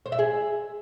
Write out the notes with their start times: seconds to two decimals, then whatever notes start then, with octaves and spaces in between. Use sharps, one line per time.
0.06 C5
0.12 E5
0.19 G#4